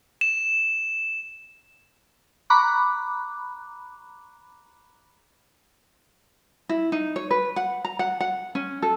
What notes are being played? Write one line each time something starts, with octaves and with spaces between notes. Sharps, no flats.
E7
A#5 B5 C#6 D6 F#6
E4
D#4
C#5
B4
F#5
A#5
F#5
F#5
C#4
A4